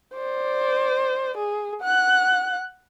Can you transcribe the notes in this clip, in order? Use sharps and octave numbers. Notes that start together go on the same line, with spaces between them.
C5 D5
G#4
F#5 F#6